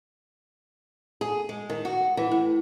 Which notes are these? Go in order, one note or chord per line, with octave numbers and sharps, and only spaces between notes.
G#4
G#3
D#3
F#4
E3
A2